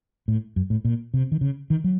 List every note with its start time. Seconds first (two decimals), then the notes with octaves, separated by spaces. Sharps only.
0.28 A2
0.56 F#2
0.70 A2
0.85 A#2
1.14 C3
1.32 D#3
1.41 C#3
1.70 D#3
1.84 F#3